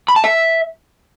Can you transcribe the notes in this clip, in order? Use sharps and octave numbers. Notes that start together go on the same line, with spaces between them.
B5
A5
E5